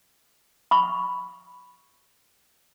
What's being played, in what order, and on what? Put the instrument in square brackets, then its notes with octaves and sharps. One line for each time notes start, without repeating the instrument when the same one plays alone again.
[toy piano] B5 C#6